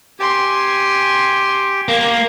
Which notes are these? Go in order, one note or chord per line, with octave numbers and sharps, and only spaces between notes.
G4 G#5 C6
A#3 A#4